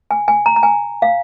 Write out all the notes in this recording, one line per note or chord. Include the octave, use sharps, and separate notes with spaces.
G#5
G#5
A#5
A#5
G#5
F5